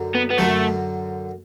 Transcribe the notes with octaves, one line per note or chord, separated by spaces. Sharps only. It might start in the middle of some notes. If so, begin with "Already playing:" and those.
Already playing: F#2 D3 F#3
B3
B3
F#2 D3 F#3 A3